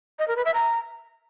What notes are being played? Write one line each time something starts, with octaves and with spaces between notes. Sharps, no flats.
D#5
A#4
B4
E5
A#5